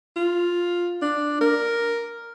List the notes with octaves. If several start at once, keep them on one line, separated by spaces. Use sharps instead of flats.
F4
D4
A#4